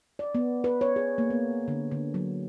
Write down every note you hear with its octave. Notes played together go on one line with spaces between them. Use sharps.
D5
B3
B4
C#5
G#4
A#3
B3
D3
D3
F#3